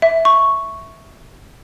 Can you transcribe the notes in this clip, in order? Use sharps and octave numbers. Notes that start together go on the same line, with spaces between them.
E5
C#6